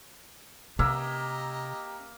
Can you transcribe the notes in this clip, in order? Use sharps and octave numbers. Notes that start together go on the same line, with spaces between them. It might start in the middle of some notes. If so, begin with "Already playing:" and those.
C3 A#3 C#4 G4 D#5 E5 A#5